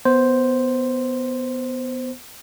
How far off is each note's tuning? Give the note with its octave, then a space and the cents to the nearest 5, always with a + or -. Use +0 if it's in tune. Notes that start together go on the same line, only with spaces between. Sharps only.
B3 +10 C5 +0